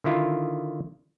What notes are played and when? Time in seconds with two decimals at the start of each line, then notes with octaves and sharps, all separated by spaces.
0.04 D3 D#3 E4 F4